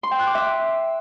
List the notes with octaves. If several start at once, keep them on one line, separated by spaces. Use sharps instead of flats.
C6
G5
F#6
D6
E5